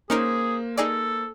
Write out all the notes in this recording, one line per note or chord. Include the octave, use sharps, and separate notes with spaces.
A#3 C#4 D#4 G#4 A#4 C5
D#4 G#4 A4 D5